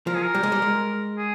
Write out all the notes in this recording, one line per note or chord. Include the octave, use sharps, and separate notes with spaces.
F3 A#4
G#4
A#4
G3
G#3
G3
G#3
G#4